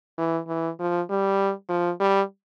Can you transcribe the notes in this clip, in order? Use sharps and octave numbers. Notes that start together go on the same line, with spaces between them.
E3
E3
F3
G3
F3
G3